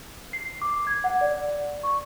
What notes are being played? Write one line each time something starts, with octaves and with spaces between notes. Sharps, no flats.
C7
D6
G#6
F#5
D5
C#6